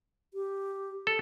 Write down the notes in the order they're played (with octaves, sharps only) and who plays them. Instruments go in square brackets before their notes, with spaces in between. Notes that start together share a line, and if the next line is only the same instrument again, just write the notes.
[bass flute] G4
[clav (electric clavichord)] A4